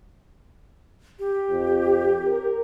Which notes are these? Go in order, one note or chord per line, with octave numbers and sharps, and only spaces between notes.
G4
F2
A#4